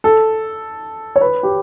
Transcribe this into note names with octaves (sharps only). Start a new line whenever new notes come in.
A4
C#5
B4
G4